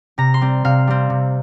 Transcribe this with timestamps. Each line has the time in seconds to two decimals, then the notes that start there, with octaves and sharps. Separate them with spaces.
0.18 C3 A#5
0.34 C6
0.41 G3 C4
0.65 C3 F5
0.87 G3 C4
1.10 C3